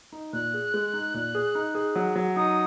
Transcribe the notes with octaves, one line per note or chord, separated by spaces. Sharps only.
D#4
A#2 F#6
G#4
G#3
D#4
A#2
G#4
D#4
G#4
F#3
F#3
D#4 D#6